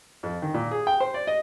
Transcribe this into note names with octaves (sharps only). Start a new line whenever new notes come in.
F2
D#3
A#2
G#4
G5
C5
D5
D#5